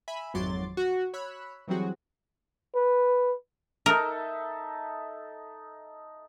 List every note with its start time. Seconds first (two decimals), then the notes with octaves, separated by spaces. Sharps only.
0.08 E5 G#5 B5
0.34 G#1 F2 F#3 C6 D6 A6
0.77 F#4
1.14 C#5 B5 E6 F#6
1.68 E3 F#3 G3 C4 F#4 G#4
2.75 B4
3.86 D#4 A4 A#4 E5